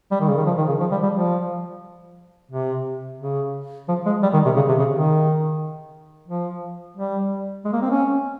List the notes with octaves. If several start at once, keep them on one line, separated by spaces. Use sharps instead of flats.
G3
D#3
C#3
D#3
F3
D#3
C#3
F3
G3
G3
F3
C3
C#3
F3
G#3
G3
D#3
C3
C#3
C3
C#3
D#3
F3
G3
G#3
A#3
C4
C#4